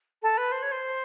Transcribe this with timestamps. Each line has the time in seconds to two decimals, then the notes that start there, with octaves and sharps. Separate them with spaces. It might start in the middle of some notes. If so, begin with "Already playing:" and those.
0.22 A4
0.37 B4
0.52 C5
0.62 C#5
0.72 C5